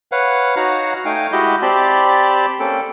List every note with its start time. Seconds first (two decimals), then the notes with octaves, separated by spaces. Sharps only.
0.12 B4 C#5 F5 F#5
0.56 D#4 F#4 C#5 F5 F#5 A#5
1.05 A3 D#4 F5 G5 G#5
1.32 G#3 E4 F#4 G4 D#5 G6
1.62 C4 G4 D5 A5 B5 C6
2.60 A#3 C#4 A4 G5